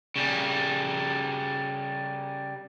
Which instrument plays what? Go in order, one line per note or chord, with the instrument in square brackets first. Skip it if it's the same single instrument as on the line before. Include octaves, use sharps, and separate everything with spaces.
[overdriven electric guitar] C#3 G3